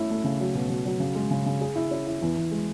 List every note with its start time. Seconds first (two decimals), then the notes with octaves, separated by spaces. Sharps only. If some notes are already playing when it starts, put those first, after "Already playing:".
Already playing: A3 C#4 E4
0.10 A3
0.24 C#3
0.40 F#3
0.55 B2
0.70 B2
0.85 F#3
1.00 C#3
1.15 G#3
1.31 C#3
1.46 C#3
1.61 G#4
1.75 E4
1.91 C#4
2.07 E4
2.22 E2
2.37 E2
2.51 G#3